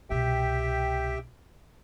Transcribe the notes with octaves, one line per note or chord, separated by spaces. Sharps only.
C2 B2 G4 E5 G5